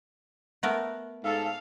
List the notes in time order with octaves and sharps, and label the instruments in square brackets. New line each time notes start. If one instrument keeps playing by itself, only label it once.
[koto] A3 B3 A#4
[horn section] G#2 A4 [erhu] F5